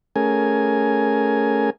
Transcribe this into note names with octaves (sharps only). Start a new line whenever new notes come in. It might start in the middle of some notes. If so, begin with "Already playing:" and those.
A3 C#4 G#4 A#4 G#5